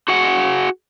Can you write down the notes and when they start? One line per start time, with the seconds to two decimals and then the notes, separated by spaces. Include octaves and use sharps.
0.08 F#4 G#4 F#5